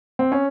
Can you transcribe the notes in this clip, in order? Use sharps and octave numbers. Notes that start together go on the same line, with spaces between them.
C4
C#4